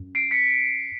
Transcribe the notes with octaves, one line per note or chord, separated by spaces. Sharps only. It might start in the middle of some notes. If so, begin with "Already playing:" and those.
Already playing: F#2
C7 D7
B6 C#7